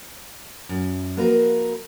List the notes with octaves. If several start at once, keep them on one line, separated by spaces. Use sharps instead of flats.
F#2
F3 A#3 F#4 A#4 B4